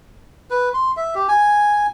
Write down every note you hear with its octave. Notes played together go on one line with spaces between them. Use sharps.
B4
C6
E5
G4
G#5